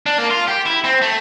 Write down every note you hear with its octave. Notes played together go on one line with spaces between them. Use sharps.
D4
A#3
F4
G4
E4
C4
A3